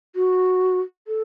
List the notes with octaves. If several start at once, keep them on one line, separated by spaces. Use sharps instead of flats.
F#4
A4